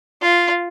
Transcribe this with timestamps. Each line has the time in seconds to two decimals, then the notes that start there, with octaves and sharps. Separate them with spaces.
0.21 F4